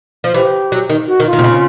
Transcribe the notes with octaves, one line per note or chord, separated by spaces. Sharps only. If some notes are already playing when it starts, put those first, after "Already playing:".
F3
E3 G4
F#3
D#3
F#4
D#3
F4
D#3
C3
C#3